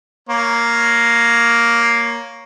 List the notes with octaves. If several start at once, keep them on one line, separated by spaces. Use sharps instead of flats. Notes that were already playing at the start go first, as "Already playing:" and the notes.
A#3 C#5